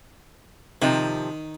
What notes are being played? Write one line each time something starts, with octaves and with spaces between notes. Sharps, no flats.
C3 D#3 F3